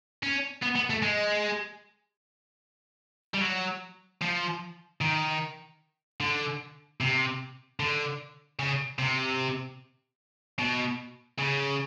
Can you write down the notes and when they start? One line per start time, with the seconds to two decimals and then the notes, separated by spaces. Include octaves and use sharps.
0.23 C#4
0.63 B3
0.76 B3
0.90 A3
1.02 G#3
3.34 G3
3.41 F#3
4.22 F3
5.01 D#3
6.20 D3
7.00 C3
7.80 D3
8.59 C#3
8.99 C3
10.59 B2
11.39 C#3